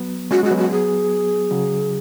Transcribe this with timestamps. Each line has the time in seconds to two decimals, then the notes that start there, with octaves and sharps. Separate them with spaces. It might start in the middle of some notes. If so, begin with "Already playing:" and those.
Already playing: F#3 B3
0.31 G#3 C#4 F#4
0.43 G#3 F#4
0.51 F#3 B3
0.57 F#4
0.71 G#4
1.51 C#3 F#3